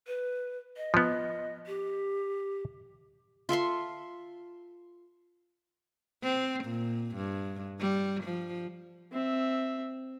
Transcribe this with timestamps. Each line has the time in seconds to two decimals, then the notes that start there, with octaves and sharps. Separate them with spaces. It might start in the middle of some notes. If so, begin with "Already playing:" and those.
0.07 B4
0.77 D#5
0.94 F3 B3
1.67 G4
3.49 F4 A4 E5 C6
6.23 C4
6.64 A#2
7.16 G2
7.80 G3
8.24 F3
9.12 C4 E5